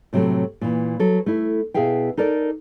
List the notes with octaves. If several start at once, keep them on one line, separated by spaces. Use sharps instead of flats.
A2 C3 F#3 G3 A3
A#2 E3
F#3 A4
A3 E4
B2 E4 G#4 E5 F5 G5
D#4 A4 A#4 D5